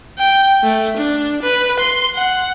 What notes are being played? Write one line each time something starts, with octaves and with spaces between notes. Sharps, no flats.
G5
A3
D4
B4
C6
F#5